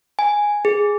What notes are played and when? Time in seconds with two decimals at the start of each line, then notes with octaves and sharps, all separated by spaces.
0.19 G#5
0.65 G#4